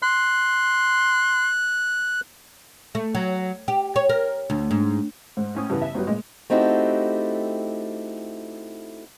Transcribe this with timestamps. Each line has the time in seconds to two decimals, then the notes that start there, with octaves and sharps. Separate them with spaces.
0.03 C6 F#6
2.95 A3
3.15 F#3
3.68 G4
3.96 C#5
4.09 A#4
4.50 D2
4.71 G#2
5.37 G#2
5.55 A2 C#4 D#6
5.70 G2 C#3 E3 B3
5.82 E5
5.94 G1 F#3 G3 B4
6.07 A#2 G#3 D#5
6.50 A3 C4 D#4 E4 F#4 G4